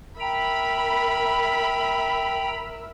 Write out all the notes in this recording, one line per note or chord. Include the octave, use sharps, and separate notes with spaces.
A#4 E5 G5 A#5 B5